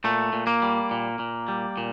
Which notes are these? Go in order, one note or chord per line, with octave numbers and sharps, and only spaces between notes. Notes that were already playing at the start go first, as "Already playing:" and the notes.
A#2 A3
A#2
A#3
G3
A#2
A#2
G3
A#2